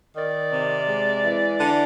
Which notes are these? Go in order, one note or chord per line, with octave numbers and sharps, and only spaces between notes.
D#3 D5
C3
G#3
E3
D3